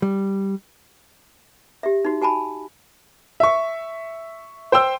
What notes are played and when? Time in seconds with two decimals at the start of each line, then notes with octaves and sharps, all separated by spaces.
0.02 G3
1.83 G4 E5
2.05 D#4 F#4
2.21 F#4 G#5 A5 B5
3.40 E5 C#6
4.72 C5 G5 C6 E6